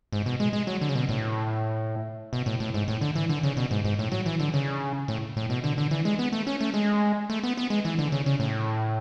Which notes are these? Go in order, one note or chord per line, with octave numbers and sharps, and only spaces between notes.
G#2
B2
G#3
G#3
F#3
D3
C#3
B2
A2
B2
A2
A2
G#2
A2
D3
E3
D3
C#3
B2
G#2
G#2
A2
F#3
E3
D3
C#3
A2
A2
B2
D3
D3
E3
G#3
B3
A3
C#4
A3
G#3
A3
B3
B3
G#3
E3
D3
C#3
C#3
A2